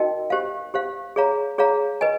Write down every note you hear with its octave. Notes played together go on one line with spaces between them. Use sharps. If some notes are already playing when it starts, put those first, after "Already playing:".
Already playing: D#4 F#4 A#4 D#5 G5
G4 C5 F5
G4 C5 F5
G#4 C#5 F5 A#5
G#4 C#5 F5 A#5
B4 D#5 G#5